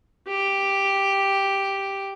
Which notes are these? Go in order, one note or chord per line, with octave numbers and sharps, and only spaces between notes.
G4